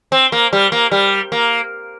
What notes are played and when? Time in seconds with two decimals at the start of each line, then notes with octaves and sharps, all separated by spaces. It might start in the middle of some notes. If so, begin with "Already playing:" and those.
0.12 C4
0.32 A#3
0.53 G3
0.72 A#3
0.91 G3
1.32 A#3